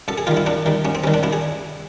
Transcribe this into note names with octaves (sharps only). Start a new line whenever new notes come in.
F#2 A4
G#4
D#3 G3 F4
E4
F#2 D4
D#3 G3
F#2 C#4
C4
D#3 G3 C#4
D4
F#2 E4
G#4